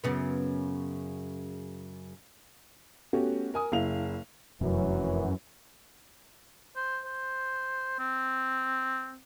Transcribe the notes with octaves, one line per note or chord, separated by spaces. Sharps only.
F#2 C#3 B3
A3 B3 C#4 F#4 G4
A#4 G#5 D#6
F#1 E4 F5 F7
F1 F#2 E3 F#3
C5
C5
C4